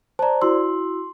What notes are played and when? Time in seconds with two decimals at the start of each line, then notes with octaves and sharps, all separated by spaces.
0.19 C5 D5 A5 A#5
0.42 E4 F#4 C6 E6